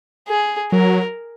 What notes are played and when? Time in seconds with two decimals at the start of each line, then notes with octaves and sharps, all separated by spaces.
0.29 G#4
0.72 F#3 A#4